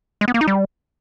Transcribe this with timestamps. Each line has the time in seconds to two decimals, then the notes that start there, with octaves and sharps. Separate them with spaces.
0.21 G#3
0.28 B3
0.34 A#3
0.41 D#4
0.47 G3